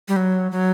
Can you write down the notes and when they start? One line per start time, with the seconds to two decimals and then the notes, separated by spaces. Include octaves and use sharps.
0.08 G3
0.16 F#3
0.51 F#3